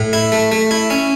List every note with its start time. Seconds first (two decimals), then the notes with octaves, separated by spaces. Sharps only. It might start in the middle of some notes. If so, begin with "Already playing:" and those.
Already playing: A2
0.13 E4
0.32 A3
0.52 A3
0.71 E4
0.90 C#4